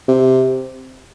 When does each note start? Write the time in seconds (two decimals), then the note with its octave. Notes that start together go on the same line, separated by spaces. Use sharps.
0.08 C3